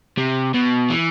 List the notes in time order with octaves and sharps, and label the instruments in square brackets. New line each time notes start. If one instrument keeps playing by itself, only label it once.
[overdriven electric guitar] C3
B2
E3